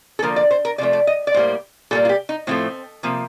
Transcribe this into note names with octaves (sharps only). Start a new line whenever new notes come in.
A4
D3 F3 A#3 A#4
D5
C5
A#4
C3 F3 A3 D5
D5
D#5
D5
A2 G3 A#3 C5
A#2 G3 A#3 A4
F4
G4
D#4
A2 F3 A3 C4
C3 F3 A#3